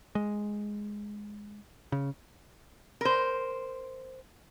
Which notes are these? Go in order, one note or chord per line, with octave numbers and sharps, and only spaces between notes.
G#3
C#3
A#4 C5